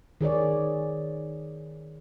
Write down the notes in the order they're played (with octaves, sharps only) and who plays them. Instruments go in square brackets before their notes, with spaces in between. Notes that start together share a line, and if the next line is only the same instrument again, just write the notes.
[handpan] D#3 G#4 C#5 D5